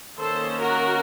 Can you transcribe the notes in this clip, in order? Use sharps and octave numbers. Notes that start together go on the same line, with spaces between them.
D#3 A#3 C#4 A4 C5
F#4 A#4